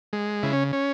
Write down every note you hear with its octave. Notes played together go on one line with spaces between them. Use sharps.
G#3
C#3 E4
C#4
C#4